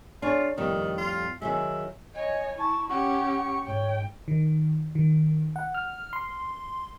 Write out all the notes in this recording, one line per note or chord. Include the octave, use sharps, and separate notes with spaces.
D4 F4 G#4 C#5
F2 A2 D#3 G3
F4
D#3 F#3 G#3 E5
C#5 D#5 G#5
E4 A5 C#6
C#4 G4 F#5 C#6
G#2 C#5 G5
D#3
D#3
F#5
F6
C6